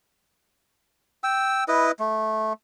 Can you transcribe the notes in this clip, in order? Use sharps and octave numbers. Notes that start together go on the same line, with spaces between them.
G5 E6
E4 B4 D#5
A3